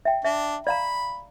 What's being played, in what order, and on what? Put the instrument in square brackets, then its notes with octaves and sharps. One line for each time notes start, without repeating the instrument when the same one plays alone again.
[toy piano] E5 G5
[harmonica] D4 [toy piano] E5
[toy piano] D5 F5 A#5 [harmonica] B5